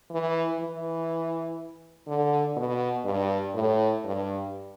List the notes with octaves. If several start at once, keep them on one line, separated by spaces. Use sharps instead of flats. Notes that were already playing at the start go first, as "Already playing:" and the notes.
E3
E3
D3
B2
G2
A2
G2